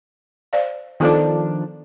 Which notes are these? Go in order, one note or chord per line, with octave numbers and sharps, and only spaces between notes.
C5 D5 F5
D#3 F3 B3 D4 F4 A4